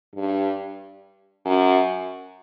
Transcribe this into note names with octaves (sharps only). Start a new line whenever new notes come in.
G2
F#2